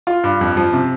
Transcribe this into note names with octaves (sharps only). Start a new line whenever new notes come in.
F4
G2
F2
F3
C3